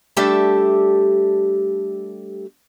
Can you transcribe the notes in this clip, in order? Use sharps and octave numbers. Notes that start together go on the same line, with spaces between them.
G3 A3 D4 G4 A4 E5